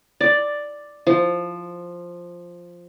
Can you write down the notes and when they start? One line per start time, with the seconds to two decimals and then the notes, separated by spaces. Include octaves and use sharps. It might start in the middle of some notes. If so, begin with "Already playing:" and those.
0.21 D5
1.07 F3